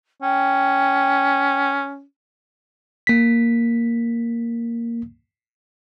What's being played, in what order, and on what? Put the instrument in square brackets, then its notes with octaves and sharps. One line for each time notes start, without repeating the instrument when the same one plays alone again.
[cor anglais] C#4 [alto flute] G5
[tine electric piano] A#3 B6